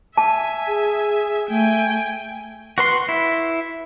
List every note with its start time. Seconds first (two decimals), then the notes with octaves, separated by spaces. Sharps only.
0.17 E5 G#5 A5
0.67 G#4
1.49 A3 G5 G#5
2.78 F#4 B4 C6
3.09 E4